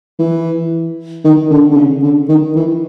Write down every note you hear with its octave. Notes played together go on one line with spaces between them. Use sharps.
E3
D#3
D3
D3
C#3
D3
D#3
E3